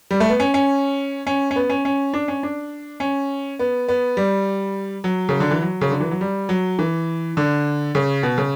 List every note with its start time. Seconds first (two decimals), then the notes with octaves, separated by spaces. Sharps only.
0.11 G3
0.20 A3
0.29 B3
0.40 C#4
0.54 C#4
1.27 C#4
1.51 C#4
1.56 B3
1.70 C#4
1.85 C#4
2.14 D4
2.28 C#4
2.43 D4
3.00 C#4
3.59 B3
3.88 B3
4.17 G3
5.04 F#3
5.29 C#3
5.40 D3
5.51 E3
5.62 F#3
5.81 C#3
5.91 D3
6.01 E3
6.11 F#3
6.21 G3
6.49 F#3
6.79 E3
7.37 D3
7.95 C#3
8.23 B2
8.38 C#3